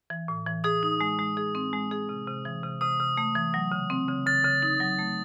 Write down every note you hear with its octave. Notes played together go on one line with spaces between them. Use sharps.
E3
A2
E3
G#4 D#6
D#4
G#3
G#3
G#4
C4
G#3
G#4
C3
C3
E3
C3
C3 D#6
C3
A3
E3
F#3
C#3
C4
C#3
C#3 A6
C#3
D#4
F#3
A3